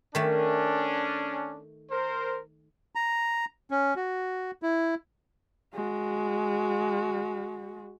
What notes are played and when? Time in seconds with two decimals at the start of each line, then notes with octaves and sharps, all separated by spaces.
0.15 D#3 A3 C#4 D4
1.91 A#4 C5
2.95 A#5
3.71 C#4
3.96 F#4
4.62 E4
5.74 G#3 F#4